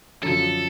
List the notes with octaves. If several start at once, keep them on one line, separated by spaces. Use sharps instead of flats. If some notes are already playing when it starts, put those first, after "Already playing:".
F#2 D3 F3 A4